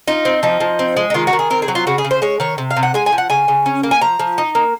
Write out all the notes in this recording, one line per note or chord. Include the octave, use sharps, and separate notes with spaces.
D#4 F4
C4
F3 D#4
F3
C4
G#3
D#4
D#3 F4
F#4
D#3
G#4
C4 A#4
G#4
F#3
F4
C#3 F#4
G#4
C#3
C5
G#3 C#5
D#3 C#5
C3
F5
C3
F#5
G#3 G#5
G#5
F3
F#5
C#3 G#5
C#3
C#4
A#3
G#5
F3 A#5
F3
D#4
A#3